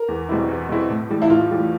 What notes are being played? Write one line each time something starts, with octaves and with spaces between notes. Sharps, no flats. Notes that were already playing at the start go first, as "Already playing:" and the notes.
Already playing: A#4
E2
B2 G3 C4 E4
E2
B2 G3 C4 E4
A2
E3 G3
E4
A2 F4
E3 G3